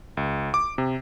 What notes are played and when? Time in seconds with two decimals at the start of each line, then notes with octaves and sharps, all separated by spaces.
0.17 C#2
0.54 D6
0.78 C3